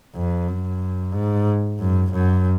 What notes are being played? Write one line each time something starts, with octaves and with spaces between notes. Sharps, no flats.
F2
F#2
G#2
F#2
F#2